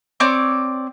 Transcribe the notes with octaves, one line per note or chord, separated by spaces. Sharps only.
C4 C#5 D5